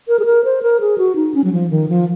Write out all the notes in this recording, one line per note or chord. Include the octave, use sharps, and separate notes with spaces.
A#4
G#4
A#4
C5
A#4
G#4
F#4
D#4
C#4
F#3
F3
D#3
F3